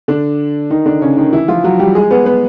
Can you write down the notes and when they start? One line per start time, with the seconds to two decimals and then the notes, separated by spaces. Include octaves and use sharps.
0.08 D3 D4
0.70 D#3 D#4
0.86 D3 D4
1.02 C#3 C#4
1.17 D#3 D#4
1.33 E3 E4
1.48 F3 F4
1.64 F#3 F#4
1.79 G3 G4
1.95 G#3 G#4
2.11 B3 B4
2.26 B3 B4